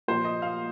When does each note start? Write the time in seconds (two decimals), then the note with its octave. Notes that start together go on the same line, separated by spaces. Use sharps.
0.08 A#2 F3 A#3 C5
0.25 D#5
0.42 F5